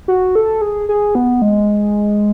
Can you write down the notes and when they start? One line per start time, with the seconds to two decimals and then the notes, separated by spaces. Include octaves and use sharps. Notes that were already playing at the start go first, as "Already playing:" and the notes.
0.08 F#4
0.35 A4
0.61 G#4
0.89 G#4
1.15 B3
1.42 G#3